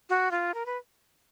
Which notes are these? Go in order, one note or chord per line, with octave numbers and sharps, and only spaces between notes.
F#4
F4
A#4
B4